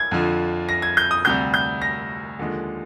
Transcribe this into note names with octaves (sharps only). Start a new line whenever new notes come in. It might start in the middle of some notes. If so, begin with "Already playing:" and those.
Already playing: G#6
F2 D3 F3
A#6
G#6
G6
D#6
D2 C3 G3 G6
G6
A#6
D#2 D3 F3 G#3